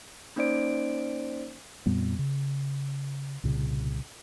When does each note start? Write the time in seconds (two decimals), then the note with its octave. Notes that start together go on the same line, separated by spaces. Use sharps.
0.36 A#3 C#4 D#4 C5 D5 D7
1.86 F2 A#2 G3 B3
2.19 C#3
3.44 C2 A#2 C#3